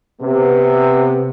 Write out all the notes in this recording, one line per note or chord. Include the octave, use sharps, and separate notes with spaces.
C3 B3